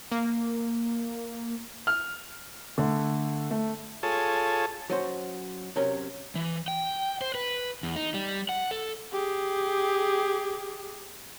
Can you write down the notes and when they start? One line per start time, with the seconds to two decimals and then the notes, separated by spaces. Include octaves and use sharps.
0.12 A#3
1.87 F6
2.78 D3 A3
3.51 A3
4.03 F4 G#4 A4 C#5 A5
4.90 F#3 C#4 F#4 C5
5.76 C3 F#3 C#4 A#4
6.35 E3
6.68 G5
7.21 C5
7.35 B4
7.83 E2
7.96 D#4
8.14 G3
8.49 F#5
8.71 A4
9.13 G4 G#4